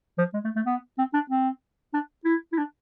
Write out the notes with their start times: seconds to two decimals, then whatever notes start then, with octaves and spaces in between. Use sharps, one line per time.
0.18 F3
0.34 G#3
0.45 A3
0.56 A3
0.66 B3
0.98 C4
1.14 D4
1.30 C4
1.94 D4
2.25 E4
2.52 E4
2.58 D4